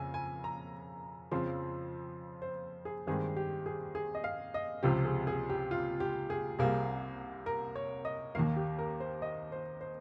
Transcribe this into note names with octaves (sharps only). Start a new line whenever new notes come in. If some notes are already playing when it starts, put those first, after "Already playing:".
Already playing: F2 C#3 G#5
G#5
A#5
F2 C#3 F3 C4 C6
C5
G#4
G2 D#3 G#3 C4 G#4
G4
G#4
G#4
D#5
F5
D#5
C#2 C3 F3 G4
G#4
G#4
G4
F4
G4
G#4
C2 C3 G3 A#3 G#4
A#4
C#5
D#5
D#2 D#3 A#3 F5
G4
A#4
C5
D#5
C5
C5